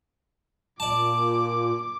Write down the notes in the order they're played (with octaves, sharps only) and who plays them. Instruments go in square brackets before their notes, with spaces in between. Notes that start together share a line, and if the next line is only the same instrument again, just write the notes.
[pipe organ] A#2 [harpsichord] D5 A5 [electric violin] D6